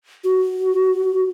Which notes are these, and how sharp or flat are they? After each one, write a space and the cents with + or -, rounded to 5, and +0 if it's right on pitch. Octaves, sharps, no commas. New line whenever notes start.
F#4 +10